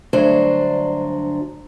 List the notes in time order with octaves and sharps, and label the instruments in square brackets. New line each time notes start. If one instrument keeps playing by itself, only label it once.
[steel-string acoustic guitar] D2 G2 F#3 D4 C5